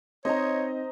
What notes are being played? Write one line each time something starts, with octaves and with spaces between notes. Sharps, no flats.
C4 D#4 C5 C#5 D#5 A#5